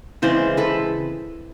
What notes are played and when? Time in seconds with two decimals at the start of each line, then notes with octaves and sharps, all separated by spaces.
0.22 C#3 E3 G#3 C4 C5 D5
0.57 A4 B4